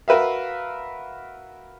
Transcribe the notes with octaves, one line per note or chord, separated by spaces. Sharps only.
F#4 A#4 B4 E5 F5